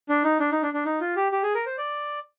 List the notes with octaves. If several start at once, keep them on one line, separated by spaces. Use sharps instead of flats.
D4
D#4
D4
D#4
D4
D4
D#4
F4
G4
G4
G#4
A#4
C5
D5